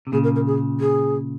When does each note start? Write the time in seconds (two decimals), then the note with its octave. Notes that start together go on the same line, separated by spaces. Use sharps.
0.07 C3
0.12 A#2 C#3 G#4
0.23 A#4
0.36 A#4
0.46 G#4
0.80 G#4